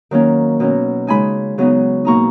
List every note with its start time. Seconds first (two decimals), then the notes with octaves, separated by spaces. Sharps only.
0.11 D#3 F#3 A#3 C#4
0.60 B2 F#3 C#4
1.07 C#3 G#3 D#4 G#5 B5
1.58 C#3 F#3 B3 D#4
2.05 B2 A#3 D#4 A#5 C#6